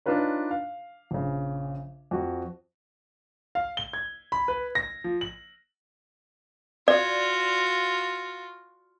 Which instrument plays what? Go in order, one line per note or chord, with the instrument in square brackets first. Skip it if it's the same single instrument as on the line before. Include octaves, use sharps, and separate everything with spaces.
[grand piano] D4 D#4 F4 B4 C#5
F5
A#1 C#3
F2 F#4
F5
G7
G#6
B5
B4
A#6
F3
F#7
[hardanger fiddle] F4 F#4 [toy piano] D5